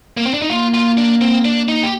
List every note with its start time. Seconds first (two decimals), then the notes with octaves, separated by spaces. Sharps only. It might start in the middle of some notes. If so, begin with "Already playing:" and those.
0.17 A#3
0.26 C4
0.34 D4
0.42 D#4
0.49 A#3 F4
0.74 F4
0.97 D4
1.21 C4
1.45 D4
1.68 D#4
1.83 G4